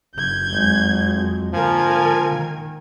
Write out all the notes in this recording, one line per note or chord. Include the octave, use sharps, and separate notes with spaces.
F#1 G6 G#6
G#1 F2 F#3 G#3
G#2 D3 F3 A#3 A#4 G#5
D#3